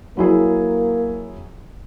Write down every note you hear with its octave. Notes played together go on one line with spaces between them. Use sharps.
F#3 A#3 E4 G#4